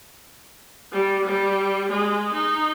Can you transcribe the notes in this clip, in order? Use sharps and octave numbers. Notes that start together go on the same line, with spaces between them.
G3
G3
G#3
D#4